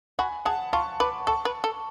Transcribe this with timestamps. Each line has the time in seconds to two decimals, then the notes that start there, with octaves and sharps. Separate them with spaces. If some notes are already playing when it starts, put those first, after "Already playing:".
0.19 F#4 G#5 B5
0.45 G#4 F#5 A5
0.73 F4 A5 C#6
1.00 B4 B5 D6
1.27 A4 A5 C#6
1.45 B4
1.64 A4